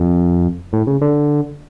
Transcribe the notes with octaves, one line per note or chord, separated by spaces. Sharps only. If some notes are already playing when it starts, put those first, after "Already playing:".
Already playing: F2
A2
C#3
D3